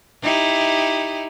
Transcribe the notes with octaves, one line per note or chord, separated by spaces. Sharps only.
D#4 E4 G4